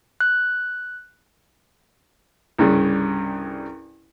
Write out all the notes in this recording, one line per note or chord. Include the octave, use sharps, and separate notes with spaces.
F#6
C2 G2 C#3